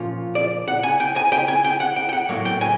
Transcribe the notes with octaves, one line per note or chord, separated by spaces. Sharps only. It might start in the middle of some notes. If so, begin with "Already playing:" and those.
Already playing: A#2 F3 A#3 C#4 F4
D5
F#5
G#5
G5
G#5
G5
G#5
G5
F#5
G5
G5
F#5
A2 F#3 A#3
G5
G#5